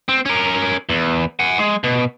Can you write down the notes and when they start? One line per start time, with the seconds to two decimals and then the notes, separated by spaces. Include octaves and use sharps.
0.09 C4
0.26 C#4 A#4
0.89 E2
1.40 F#5 G#5
1.58 G#3
1.84 B2